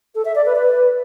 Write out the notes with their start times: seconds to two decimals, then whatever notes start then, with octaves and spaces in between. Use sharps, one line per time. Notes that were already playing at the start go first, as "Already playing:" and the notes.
0.14 A4
0.25 E5
0.35 D5
0.45 B4
0.55 B4